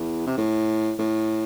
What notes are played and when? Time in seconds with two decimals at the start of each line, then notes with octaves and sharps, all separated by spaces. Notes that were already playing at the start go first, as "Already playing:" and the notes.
Already playing: E2
0.27 C3
0.38 A2
0.99 A2